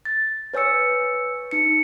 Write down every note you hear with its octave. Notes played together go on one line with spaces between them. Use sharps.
A6
B4 C#5 G#5 E6 C#7
D#4 C#7